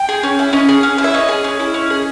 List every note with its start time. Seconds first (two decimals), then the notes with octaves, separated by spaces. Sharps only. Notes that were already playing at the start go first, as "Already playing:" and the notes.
Already playing: G5
0.09 G#4
0.23 C#4
0.39 E4
0.53 C#4 D#5
0.69 G#4
0.83 C#4
0.98 E4
1.04 E5
1.14 C#4 D#5
1.29 G#4
1.44 C#4
1.60 E4
1.74 C#4
1.90 G#4